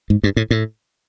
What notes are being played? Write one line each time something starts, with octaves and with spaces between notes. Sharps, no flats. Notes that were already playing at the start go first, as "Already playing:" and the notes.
G#2
G2
A2
A2